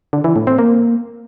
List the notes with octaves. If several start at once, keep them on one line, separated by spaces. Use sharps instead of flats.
D3
E3
A2
C4
A#3